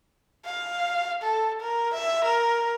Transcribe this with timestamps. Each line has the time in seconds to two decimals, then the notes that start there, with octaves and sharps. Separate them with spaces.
0.46 F5
1.23 A4
1.61 A#4
1.94 E5
2.25 A#4